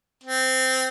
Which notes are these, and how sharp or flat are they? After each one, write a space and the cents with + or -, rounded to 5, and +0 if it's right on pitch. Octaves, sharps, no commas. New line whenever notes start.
C4 -10